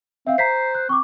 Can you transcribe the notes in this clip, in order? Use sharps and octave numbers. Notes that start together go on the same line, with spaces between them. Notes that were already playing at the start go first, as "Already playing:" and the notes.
C4 E5 F5
C5 A#5 B6 C7
F#6
C4 C#6 D6